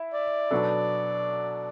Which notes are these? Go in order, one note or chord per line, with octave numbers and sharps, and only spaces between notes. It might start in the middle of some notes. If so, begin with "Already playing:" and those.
Already playing: E4
D5
B2 F#3 B3 D4 A4